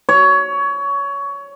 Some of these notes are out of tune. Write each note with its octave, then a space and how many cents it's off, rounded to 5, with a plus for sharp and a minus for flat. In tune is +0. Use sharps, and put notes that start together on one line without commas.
C#5 +20